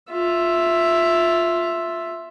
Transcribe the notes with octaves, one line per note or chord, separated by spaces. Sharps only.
F4 E5